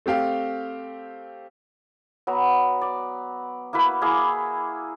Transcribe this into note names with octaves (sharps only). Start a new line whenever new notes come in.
A3 C4 G4 F5
F#3 B3 A#5
D5
A#3 E4 F#4 B4
A#3 E4 G#4